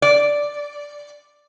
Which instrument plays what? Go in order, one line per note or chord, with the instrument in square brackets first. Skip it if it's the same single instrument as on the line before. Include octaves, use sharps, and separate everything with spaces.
[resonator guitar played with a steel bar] D5